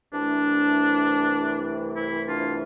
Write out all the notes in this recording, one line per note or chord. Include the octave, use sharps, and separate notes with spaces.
C2 C3 E3 A3 D4
E4
D4 F4